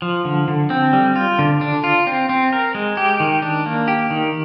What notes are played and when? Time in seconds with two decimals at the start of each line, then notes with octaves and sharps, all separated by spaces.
0.02 F3
0.25 D3
0.48 D3
0.70 C4
0.93 G3
1.16 F4
1.39 D3
1.61 D4
1.84 F4
2.07 C4
2.29 C4
2.53 A#4
2.75 G#3
2.97 G4
3.20 D#3
3.42 D4
3.66 A#3
3.88 G4
4.11 D#3